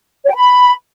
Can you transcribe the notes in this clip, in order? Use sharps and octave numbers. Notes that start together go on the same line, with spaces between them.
C#5
G5
B5